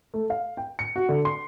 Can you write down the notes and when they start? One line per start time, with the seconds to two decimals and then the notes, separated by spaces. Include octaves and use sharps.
0.14 A3
0.30 F5
0.57 G5
0.79 C#7
0.96 F#4
1.09 D3
1.25 C6